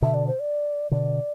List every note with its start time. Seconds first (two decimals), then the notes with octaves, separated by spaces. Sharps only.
0.02 B2 D3 E5
0.14 D5
0.27 C5
0.40 D5
0.91 B2 D3 D5